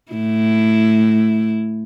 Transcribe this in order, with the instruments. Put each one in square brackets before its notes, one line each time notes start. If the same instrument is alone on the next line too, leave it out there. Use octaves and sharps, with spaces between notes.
[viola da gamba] A2 E4